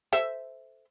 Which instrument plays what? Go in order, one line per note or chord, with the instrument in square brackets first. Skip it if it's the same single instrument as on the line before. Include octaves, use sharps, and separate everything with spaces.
[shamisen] A4 C5 E5